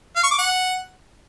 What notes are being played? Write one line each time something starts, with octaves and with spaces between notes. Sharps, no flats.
F5
C#6
D6
F#5